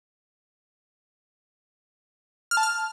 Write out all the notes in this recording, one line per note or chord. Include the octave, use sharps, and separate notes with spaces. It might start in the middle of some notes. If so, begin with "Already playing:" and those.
F6
A5
F6